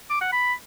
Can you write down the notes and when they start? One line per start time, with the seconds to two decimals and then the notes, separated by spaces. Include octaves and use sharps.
0.10 D6
0.21 F#5
0.32 B5